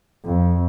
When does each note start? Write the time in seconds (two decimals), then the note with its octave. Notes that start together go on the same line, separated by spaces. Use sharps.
0.25 F2